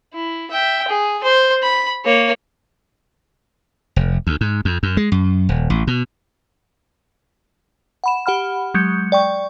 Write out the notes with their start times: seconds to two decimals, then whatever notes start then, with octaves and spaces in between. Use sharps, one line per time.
0.13 E4
0.51 E5 G5
0.88 G#4
1.23 C5
1.62 B5
2.05 A#3 C#5
3.96 F1
4.27 D2
4.41 G#2
4.65 F2
4.83 F#2
4.97 G#3
5.12 F#2
5.49 D#1
5.70 A1
5.87 B2
8.04 F#5 B5 E7
8.26 G4 F#5 B5 F6
8.74 F#3 G#3 G6 C#7
9.12 D5 G5 C#6